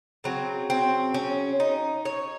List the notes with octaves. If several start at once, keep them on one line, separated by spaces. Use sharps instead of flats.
C#3 F#3 C4
C4
C#4
D#4
C#5